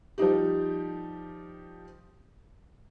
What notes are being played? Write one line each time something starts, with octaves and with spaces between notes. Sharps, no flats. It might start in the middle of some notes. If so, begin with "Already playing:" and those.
F3 G3 D#4 G4